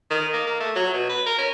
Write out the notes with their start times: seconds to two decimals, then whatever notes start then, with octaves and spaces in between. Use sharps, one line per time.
0.10 D#3
0.33 A#3
0.47 A#3
0.60 A3
0.76 F#3
0.93 B2
1.10 B4
1.26 A#4
1.39 C#4